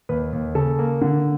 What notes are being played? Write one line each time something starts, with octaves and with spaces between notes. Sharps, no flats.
D#2 B4
D#2
C#3 A4
A#3
D3